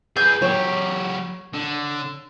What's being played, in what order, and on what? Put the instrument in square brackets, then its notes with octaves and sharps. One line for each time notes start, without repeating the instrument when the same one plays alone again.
[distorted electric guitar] G#4 B4 [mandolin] G6
[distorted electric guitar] F#3 G4 [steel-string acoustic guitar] C#5
[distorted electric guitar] D3